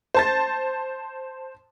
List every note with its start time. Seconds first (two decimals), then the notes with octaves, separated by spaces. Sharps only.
0.15 C5 A5 A6